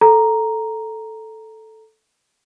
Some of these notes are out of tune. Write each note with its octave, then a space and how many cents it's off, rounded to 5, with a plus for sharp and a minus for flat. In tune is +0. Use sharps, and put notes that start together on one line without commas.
A4 +0 A#5 +0